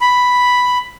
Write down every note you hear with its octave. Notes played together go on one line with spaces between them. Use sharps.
B5